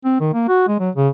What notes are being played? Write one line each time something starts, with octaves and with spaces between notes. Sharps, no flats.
C4
D#3
A#3
F#4
G#3
F#3
C#3